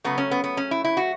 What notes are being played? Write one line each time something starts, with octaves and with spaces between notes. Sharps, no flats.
C#3 F#3 A3 B3
C#4
B3
B3
C#4
E4
E4
F#4